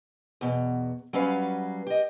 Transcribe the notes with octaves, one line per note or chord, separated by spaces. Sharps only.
E2 B2
F#3 G3 C#4 B4 F5
G4 D#5